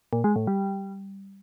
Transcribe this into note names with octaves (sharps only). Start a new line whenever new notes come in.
A#2
G#3
A2
G3